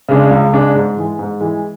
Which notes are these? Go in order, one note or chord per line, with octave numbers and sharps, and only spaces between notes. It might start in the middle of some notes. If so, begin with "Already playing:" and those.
C#3 G#3 D4
C#2
C#3 G#3 D4
G#2
E3 G#3
G#2
E3 G#3